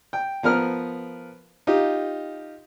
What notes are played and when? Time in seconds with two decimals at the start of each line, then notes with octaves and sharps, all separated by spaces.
0.13 G5
0.43 F3 B3 A#4 F6
1.67 D#4 F4 G4